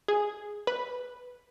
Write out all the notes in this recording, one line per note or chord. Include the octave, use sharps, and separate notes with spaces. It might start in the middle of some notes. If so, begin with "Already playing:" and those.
G#4
B4